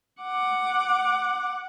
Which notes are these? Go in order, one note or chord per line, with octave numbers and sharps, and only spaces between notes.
F#5 D6